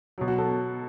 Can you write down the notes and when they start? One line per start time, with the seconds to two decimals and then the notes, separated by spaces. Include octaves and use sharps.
0.18 B2 F#3
0.28 F#4
0.38 A4